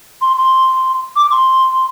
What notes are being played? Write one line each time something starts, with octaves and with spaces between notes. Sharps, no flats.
C6
C6
D6
C6